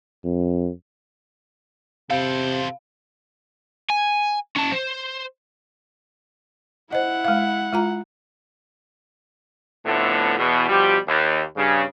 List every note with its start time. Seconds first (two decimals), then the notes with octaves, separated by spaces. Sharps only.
0.24 F2
2.10 C3 A4 C5 F5
3.90 G#5
4.56 C#4 A5
4.71 C5
6.92 E4 C5 D#5 F#5
7.25 G#3 F5
7.73 G#3 F4 A#5
9.85 F2 A2 D3 A3 B3
10.38 E2 B2
10.69 B2 F3 G3 G4
11.08 D#2
11.56 G2 C#3